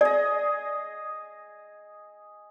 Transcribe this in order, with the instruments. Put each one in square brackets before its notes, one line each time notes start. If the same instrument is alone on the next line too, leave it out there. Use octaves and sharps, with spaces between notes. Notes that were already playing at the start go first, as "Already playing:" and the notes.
[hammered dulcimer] G#4 D#5 [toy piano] D5